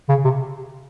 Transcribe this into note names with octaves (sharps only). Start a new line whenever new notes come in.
C#3
C3